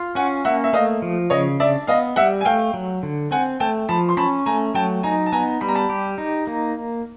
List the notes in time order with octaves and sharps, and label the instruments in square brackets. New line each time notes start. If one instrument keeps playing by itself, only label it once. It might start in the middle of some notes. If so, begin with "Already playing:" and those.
Already playing: [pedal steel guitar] F4
[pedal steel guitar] C#4 [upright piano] F#5 G#5
[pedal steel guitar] A#3 [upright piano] E5 F#5
[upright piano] E5
[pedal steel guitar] A3 [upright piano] D#5 F5
[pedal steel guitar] F3
[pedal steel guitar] C#3 [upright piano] C#5 D#5
[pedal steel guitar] D4 [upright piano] D5 E5
[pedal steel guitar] B3 [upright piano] D#5 F5
[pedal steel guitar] G3 [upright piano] E5 F#5
[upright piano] G#5
[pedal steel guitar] A3 [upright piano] F5 G5
[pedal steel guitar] F#3
D3
[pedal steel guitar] C4 [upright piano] F#5 G#5
[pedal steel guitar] A3 [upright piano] G5 A5
[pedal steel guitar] F3 [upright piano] A5 B5
[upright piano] C6
[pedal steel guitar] C#4 [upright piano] A5 B5
[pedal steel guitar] A3 [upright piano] G#5 A#5
[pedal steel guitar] F#3 [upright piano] G5 A5
[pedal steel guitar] D#4 [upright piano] G#5 A#5
[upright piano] A5
[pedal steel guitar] B3 [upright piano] G#5 A#5
[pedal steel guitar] G3 [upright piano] B5
[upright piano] A#5
A5 B5
[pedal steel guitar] G4
D#4
A#3